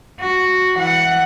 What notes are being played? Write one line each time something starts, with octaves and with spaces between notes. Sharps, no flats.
F#4
E3 F#5